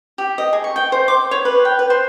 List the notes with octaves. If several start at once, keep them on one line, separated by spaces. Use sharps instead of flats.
G4
D#5
G#4
C#6
G5
C5
D6
C#5
B4
G5
B4
C5